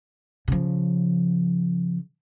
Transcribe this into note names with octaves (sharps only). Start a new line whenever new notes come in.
C#3 F3